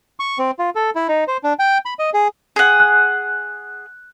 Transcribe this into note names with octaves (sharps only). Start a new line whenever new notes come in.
C#6
C4
F4
A4
E4
D#4
C5
D4
G5
B5
D#5
G#4
G#4 F#5
F#6